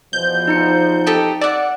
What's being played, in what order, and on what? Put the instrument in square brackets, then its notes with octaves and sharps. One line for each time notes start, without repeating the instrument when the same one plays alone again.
[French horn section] E2 B2 F3 [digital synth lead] G6
[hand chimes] D#4 A#5 C#7
[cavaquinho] G4 A4 D#5
[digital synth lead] D5 [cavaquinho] E5 F#5